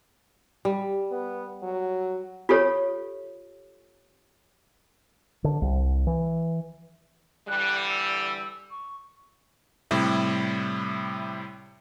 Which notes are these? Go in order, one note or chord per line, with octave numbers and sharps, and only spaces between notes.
G3
B3
F#3
F4 G4 A4 C#5
D3
C2
E3
D3 E3 G3 F#6
E6
C#6
A2 C3 G3 E4